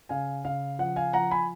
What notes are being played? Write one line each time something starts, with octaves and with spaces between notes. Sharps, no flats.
C#3 F5 G#5
C#3 F5
F3 F#5
F5 G#5
F3 F#5 A#5
G#5 B5